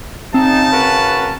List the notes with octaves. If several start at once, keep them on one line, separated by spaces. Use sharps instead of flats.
C#3 C4 D#4 A5
F#4 A#4 B4